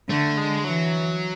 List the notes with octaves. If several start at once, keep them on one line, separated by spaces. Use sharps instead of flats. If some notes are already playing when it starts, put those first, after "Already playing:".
D3 A3
G#3
E3 F#3